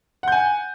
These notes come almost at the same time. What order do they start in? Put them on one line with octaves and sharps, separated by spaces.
F#5 G6 G#5